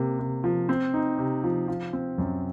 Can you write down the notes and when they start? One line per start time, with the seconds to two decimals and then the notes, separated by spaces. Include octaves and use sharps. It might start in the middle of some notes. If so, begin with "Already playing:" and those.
Already playing: C3 A#3
0.19 C3
0.44 F3
0.69 C4
0.93 D#4
1.18 C3
1.44 F3
1.68 F3
1.93 C4
2.18 F#2